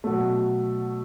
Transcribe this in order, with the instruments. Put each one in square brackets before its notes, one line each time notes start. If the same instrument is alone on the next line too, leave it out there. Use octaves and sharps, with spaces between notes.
[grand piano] B2 F#3 A3